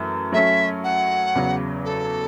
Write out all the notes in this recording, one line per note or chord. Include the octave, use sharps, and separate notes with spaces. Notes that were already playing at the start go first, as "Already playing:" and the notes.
Already playing: F#2 E3 A3
F#3 A3 C#4 E5
F#5
E2 C#3 F#3
A4